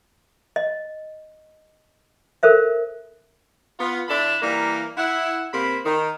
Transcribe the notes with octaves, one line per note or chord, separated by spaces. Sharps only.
D#5
A4 A#4 C5 E5
B3 F4
D3 D4 E4 A5 B5
E3 G3 A#3
E4 F#5
C3 A#3 C5 B5
D#3